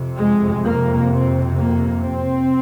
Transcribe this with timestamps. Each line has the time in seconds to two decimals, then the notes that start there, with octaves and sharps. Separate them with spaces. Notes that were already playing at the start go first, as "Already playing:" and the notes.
Already playing: F2 C3
0.18 G#3
0.64 A#3
1.11 C4
1.57 A#3
2.03 C4